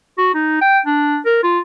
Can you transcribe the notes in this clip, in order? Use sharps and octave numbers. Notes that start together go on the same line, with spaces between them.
F#4
D#4
G5
D4
A#4
F4